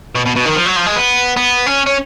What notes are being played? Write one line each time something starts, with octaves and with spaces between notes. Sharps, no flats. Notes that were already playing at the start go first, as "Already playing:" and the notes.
B2
B2
B2
D#3
F3
F#3
F3
G#3
B3
B3
C#4
C#4